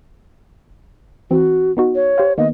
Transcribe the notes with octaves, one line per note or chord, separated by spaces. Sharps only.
E3 C4 F#4
B3 D#4 F#4
C#5
G4 C5 F5
D#3 A#3 B3 D#5